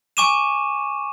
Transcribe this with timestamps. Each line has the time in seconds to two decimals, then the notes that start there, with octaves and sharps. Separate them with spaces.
0.17 G#5 C#6 D6 D#7 E7